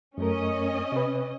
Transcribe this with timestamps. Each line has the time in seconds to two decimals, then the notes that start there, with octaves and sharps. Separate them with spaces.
0.18 F#2 A3 C#4 A#4 D#5
0.92 C3 B4